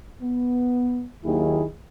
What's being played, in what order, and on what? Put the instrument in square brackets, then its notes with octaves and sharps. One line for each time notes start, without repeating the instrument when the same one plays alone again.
[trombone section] B3
D#2 D#3 F#3 A#3 E4 G#4